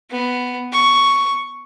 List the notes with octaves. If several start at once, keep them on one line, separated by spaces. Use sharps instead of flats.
B3
C#6